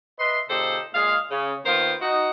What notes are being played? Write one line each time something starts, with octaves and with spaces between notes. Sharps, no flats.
B4 D#5 E5 C6
A#2 C#3 D#4 G4 A4 C5
A#2 G#3 G#4 F5
C#3
D#3 A#3 B3 F4 A#4 C5
D#4 F#4